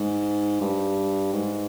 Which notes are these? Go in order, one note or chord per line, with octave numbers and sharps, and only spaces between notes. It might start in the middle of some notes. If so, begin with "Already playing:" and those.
Already playing: G#2
G2
G#2